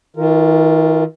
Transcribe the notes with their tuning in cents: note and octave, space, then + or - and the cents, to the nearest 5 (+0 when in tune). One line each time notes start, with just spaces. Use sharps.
D#3 +45 F4 +0 A#4 -15